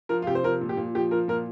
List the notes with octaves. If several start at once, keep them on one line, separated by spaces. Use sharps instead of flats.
F3 A#4
F4
C3 G4
C5
F3 A#4
A#2
G4
A#2
F3 G4
F3 A#4
A#2 A#4